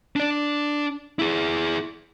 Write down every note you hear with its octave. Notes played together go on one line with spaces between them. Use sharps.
D4 D5
E4 G#4